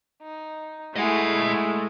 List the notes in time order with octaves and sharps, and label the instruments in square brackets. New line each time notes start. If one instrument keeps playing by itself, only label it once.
[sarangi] D#4
[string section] G#3 A3 [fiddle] E4 [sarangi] G#4 [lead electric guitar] D#5 F#5